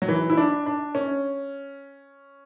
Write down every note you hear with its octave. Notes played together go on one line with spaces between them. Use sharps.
F#3
E3
E4
D4
D4
C#4